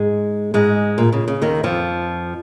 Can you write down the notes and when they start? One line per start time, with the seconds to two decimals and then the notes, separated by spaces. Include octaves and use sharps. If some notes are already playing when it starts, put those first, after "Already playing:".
Already playing: G#2 G#3
0.54 G#2 G#3
0.98 A#2
1.12 C#3
1.28 C#3
1.42 D#2 D#3
1.63 F2 F3